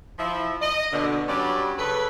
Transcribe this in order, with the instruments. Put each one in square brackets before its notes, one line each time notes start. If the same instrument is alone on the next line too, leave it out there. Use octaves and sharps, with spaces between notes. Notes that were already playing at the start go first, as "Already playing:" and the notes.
[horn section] F3 E4
D#5
B2 D3
G2 F#3 G3 C#4 D5
C#3 A4 B4